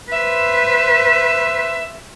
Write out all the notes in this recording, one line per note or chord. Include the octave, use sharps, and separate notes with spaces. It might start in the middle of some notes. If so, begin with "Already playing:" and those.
B4 C5 E5